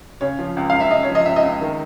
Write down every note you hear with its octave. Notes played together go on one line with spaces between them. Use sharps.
C#3 C#5
F3
C#2
C#2 F5
E5
C#3 D#5
C#5
F3
D#5
C#2 E5
D#5
C#2
D#3